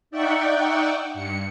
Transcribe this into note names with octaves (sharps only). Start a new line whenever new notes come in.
D#4 D5 E5 F#5 G5 C#6
G2 C#7